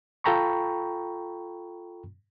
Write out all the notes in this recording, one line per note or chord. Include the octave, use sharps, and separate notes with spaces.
F4 A4 G5 A#5 B5 C#6